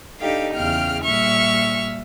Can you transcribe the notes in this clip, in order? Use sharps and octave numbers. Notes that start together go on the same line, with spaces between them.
D4 D#4 G4 A4 F5 G5
E2 C#3 F5 G5 F6
A#2 G3 E5 C#6 F6